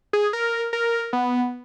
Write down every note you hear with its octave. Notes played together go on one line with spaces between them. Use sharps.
G#4
A#4
A#4
B3